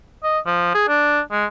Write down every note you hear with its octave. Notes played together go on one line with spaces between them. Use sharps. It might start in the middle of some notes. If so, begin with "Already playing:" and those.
D#5
F3
G#4
D4
G#3